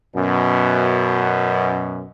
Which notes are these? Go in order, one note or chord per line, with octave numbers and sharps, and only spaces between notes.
F#2 B2